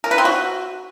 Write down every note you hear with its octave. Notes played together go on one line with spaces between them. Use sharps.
A#4
B4
C4
F#4